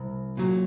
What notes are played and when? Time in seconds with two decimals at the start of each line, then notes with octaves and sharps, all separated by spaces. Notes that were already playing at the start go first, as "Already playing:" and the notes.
Already playing: C2
0.37 A#2 F#3